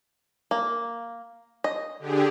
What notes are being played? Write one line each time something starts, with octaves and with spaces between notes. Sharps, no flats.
A#3
D#5
D3 G4 G#4